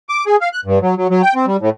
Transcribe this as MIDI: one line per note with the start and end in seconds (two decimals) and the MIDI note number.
0.09 0.24 86
0.26 0.36 68
0.41 0.49 77
0.53 0.60 90
0.65 0.79 43
0.82 0.95 54
0.97 1.07 54
1.10 1.22 54
1.22 1.34 79
1.35 1.46 60
1.47 1.57 55
1.61 1.70 45